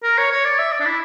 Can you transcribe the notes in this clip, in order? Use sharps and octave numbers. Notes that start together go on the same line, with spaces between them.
A#4
C#5
C#5
D5
E5
D5
D4
E4